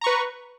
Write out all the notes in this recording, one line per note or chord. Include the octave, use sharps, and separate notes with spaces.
B4 A#5 C#6